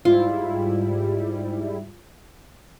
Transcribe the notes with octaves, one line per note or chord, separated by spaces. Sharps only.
G#2 G3 E4 F4